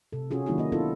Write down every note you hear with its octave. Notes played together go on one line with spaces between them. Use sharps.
C3 A4
C3 C#4 F4 F#4 G#4
D#3 F#3 A#3 D4 E4 F#4
A#3 D#5
B3 C#4 D4 E4 F4 A4